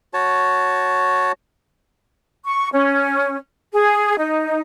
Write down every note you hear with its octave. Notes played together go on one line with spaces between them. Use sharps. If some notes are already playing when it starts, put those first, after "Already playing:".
F#4 C#5 A5
C#6
C#4
G#4
D#4